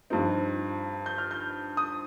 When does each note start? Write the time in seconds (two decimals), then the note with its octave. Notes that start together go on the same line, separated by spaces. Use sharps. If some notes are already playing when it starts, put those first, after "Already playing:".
0.10 G2 F3 C4 D#4
1.06 G6
1.18 F6
1.31 G6
1.77 D#6